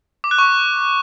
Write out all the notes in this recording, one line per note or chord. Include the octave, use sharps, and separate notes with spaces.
D6
F#6
C#6